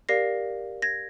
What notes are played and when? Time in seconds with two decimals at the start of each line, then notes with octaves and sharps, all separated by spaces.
0.09 G4 A#4 D5 F5 A#6 C7
0.82 G#6 A#6